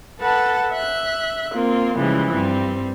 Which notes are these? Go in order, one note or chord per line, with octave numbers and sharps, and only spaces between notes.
A4 B4 F#5 A5
E5 F#6
A#3 C4 F4
C#3 E3 F3 G3 G#3
G2 G3 C4